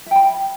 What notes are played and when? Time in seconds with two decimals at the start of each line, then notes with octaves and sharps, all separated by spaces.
0.06 E5
0.11 G5
0.16 B5